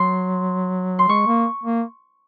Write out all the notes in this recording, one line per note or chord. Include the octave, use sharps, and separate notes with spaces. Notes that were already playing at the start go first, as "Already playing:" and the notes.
Already playing: F#3 C6
C6
G#3 C#6
A#3
A#3